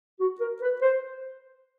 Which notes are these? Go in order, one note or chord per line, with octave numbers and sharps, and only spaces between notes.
F#4
A#4
B4
C5